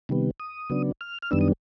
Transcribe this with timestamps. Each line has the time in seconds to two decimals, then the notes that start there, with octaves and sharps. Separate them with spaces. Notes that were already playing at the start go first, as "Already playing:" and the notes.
0.09 C3 D#3 G3 B3
0.40 D#6
0.70 C#3 F#3 B3 D4
1.01 F6
1.22 F6
1.31 F#2 D#3 G3 B3 D4 E6
1.41 D#6